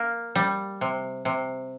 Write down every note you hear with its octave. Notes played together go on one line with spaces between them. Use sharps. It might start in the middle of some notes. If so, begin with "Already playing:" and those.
Already playing: A#3
G3
C3
C3